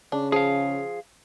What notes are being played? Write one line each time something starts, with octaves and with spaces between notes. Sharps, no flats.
C#3 D4
F3 G#4 F5